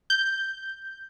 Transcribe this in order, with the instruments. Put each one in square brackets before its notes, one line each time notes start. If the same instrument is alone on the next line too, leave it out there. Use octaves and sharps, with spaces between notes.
[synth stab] G6